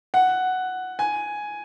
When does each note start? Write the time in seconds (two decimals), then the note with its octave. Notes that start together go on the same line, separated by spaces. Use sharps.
0.14 F#5
0.99 G#5